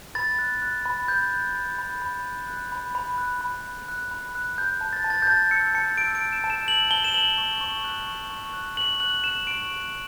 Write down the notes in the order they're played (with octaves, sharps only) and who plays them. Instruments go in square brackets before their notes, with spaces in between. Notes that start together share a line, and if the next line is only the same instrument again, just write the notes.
[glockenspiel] B5 A6
F#6
F#6
B5
B5 G6
F#6
B5
B5
B5
F#6
F#6
B5
B5
F#6
B5
B5
F#6
B5
F#6
A5 G6
A5
A6
A5
A6
G6
A5 A6
E6 C#7
A5 C#7
E6 D7
D7
A5
E7
A5
E7
E6 F#7
A5 G7
E7
A5 F#7
C#6
C#6
F#6
C#6
C#6
F#6
C#6 F#7
F#6 F#7
F#6 E7
C#6 D7
F#6